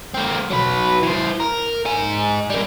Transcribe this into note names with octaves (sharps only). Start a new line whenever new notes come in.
A#3 C4
F#3 B4
E3 C5
A#4
D#4 G#5
G3 A#3